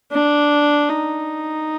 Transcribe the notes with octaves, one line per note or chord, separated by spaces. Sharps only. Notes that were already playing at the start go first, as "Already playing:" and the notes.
D4
D#4